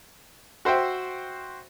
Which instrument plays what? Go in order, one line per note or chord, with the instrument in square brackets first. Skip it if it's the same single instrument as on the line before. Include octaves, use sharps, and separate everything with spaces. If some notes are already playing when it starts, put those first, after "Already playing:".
[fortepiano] F#4 C5 E5 G5